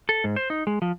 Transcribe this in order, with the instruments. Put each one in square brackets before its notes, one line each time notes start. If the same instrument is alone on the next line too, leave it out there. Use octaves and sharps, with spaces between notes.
[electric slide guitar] A4
G#2
C5
D#4
G#3
F3